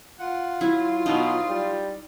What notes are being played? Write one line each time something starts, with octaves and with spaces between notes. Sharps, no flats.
F4 F#5
F#3 E4
B2 D#4
G3